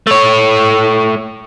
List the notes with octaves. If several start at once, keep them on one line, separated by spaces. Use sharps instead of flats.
A3 C#5